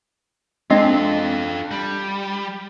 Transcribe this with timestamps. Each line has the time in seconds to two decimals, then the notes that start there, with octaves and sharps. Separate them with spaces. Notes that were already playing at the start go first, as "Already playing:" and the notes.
0.70 G#3 C4 D4 F4 A4 D#5
1.71 G3